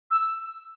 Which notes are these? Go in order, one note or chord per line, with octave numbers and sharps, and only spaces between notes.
E6